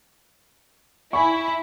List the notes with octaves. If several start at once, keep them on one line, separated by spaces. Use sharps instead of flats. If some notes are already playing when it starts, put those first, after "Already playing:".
E4 G#5 B5 C#6